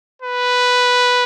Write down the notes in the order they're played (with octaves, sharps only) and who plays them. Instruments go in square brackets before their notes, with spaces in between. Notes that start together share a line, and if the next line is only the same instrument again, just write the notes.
[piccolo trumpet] B4